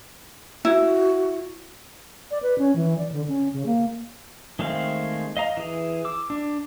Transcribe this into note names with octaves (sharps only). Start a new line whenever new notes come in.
E4 F#4
D5
B4
C#4
E3
D5
D3
C#4
C#3
A#3
D#3 G#3 A3 C4 F5
D#5 F5 A#5
E3 G#4
D6 E6
D4